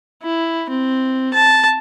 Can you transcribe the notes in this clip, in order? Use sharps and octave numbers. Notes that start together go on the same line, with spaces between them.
E4
C4
A5